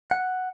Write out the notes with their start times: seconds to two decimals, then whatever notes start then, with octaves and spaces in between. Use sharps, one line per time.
0.11 F#5